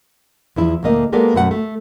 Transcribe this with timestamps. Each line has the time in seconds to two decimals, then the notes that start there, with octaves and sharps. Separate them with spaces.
0.56 E2 F3 E4
0.83 D2 A#2 A3 A#3 D#5
1.13 G3 G#3 A#3 B3 A4 D5
1.34 F#2 B2 A3 F#4 F#5
1.51 A3